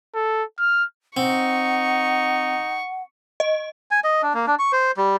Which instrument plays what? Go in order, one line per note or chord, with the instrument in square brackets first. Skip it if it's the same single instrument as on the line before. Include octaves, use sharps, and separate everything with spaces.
[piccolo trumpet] A4
F6
[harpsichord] C4 [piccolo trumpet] D#4 [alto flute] F#5 [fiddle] C#6
[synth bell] D#5
[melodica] G#5
D#5
D4
A#3
D4
C#6
C5
G3